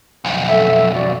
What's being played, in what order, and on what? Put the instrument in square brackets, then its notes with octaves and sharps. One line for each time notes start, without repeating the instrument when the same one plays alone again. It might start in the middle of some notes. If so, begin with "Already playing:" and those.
[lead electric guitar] B1 F2
[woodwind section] A4 E5
F#3 F#4 D5